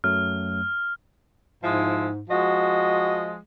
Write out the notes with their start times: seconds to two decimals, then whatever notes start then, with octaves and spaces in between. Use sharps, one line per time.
0.04 F#2 F#3 A3 F6
1.63 G#2 F3 G#3 E4
2.30 F3 G#3 F#4 D#5